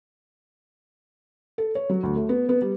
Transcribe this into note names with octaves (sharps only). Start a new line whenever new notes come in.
A4
C#5
F#3
D2
A3
B3
B3
G3